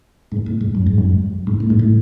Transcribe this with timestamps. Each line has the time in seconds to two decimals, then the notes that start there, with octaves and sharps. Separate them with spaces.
0.32 G#2
0.46 A2
0.61 G#2
0.75 F#2
0.87 G#2
0.98 F#2
1.47 G#2
1.60 A2
1.70 G#2
1.79 A2